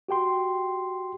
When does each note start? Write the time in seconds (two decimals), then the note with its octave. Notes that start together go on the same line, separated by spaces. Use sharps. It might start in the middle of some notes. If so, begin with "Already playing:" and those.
0.08 F#4 G4 G5 C6